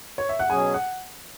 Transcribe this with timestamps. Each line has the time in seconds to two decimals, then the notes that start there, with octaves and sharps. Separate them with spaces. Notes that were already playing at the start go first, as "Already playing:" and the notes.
0.18 C#5
0.29 E5
0.39 F#5
0.50 B2 F#3 C#4 G#4 G#5
0.74 F#5